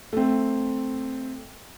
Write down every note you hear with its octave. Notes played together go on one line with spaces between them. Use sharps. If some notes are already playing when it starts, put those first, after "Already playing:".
A3 C4